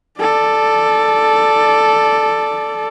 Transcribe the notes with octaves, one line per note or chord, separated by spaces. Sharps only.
A4 D5